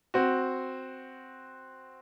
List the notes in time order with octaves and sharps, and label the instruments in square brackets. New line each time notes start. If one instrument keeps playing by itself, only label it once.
[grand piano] C4 F#4